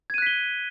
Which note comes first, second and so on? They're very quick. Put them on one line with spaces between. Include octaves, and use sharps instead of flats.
G#6 D#7 F#6 B6 G7